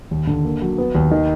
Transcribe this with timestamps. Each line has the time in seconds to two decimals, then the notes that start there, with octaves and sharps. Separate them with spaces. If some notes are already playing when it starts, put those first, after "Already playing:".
0.11 D#2
0.27 D3
0.44 A#3
0.62 F#3
0.78 B3
0.95 D#2
1.11 D#3